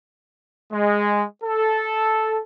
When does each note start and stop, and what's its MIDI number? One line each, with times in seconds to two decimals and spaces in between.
0.73 1.24 56
1.44 2.41 69